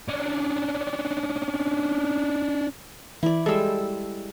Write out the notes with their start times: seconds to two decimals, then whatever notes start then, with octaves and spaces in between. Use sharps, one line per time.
0.08 C#4 D4
3.23 E3 E4 D5
3.46 G3 G#3 A4 E6